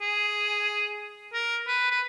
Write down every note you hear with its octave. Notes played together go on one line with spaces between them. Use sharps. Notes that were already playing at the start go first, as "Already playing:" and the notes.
G#4
A#4
B4
B4